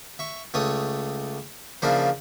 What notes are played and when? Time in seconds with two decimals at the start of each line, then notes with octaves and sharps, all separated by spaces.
0.19 E5 C#6
0.54 C#2 A3 C#5 D#6
1.82 C#3 F3 A#3 D4 E4